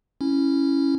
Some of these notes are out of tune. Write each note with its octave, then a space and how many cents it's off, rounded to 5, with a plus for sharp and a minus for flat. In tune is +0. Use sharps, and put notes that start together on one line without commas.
C#4 +0 E4 +0